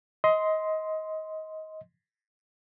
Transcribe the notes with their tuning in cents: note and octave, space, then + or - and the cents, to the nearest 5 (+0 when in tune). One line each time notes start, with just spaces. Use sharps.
D#5 +20 C6 -5